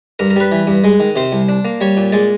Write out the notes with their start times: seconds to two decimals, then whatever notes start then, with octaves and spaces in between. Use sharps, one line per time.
0.19 G2 A#4
0.30 A#4
0.36 G3 B4
0.52 E3
0.67 G2
0.84 G#3
1.00 D#3
1.16 C3 C5
1.32 C2
1.49 D4
1.65 A#3
1.81 G3 C#5
1.97 A#2
2.12 G#3 D5